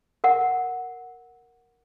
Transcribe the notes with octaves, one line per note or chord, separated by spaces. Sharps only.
A#4 F#5